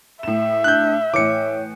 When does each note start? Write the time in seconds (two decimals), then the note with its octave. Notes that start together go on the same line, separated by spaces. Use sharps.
0.23 A2 E5 E7
0.64 D4 F#6 G6
1.14 A2 E3 C#5 D6 C#7